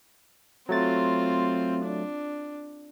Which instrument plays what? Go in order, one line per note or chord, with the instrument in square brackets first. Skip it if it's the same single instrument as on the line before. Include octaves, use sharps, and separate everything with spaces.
[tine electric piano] F#3 A3 A6 [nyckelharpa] C4 F4
[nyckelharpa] D4